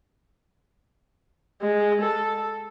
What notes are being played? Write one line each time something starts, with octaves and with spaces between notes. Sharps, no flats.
G#3
A4